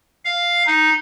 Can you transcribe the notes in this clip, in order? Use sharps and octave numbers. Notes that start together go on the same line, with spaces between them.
F5
D#4